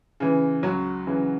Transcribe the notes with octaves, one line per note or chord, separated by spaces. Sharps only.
C#3 E3
C#2 F#3 F#4
C#3 E3